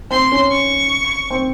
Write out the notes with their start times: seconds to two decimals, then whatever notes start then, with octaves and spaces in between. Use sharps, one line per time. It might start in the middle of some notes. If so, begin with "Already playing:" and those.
0.11 C4 C6
0.32 C#4
0.51 C#6
1.30 C4